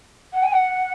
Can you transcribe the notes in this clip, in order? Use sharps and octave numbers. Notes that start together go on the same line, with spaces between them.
F#5
G#5
F#5